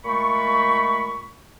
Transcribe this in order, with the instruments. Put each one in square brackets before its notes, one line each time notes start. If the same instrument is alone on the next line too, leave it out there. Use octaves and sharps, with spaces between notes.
[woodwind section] A#2 G#3 A3 B5 C#6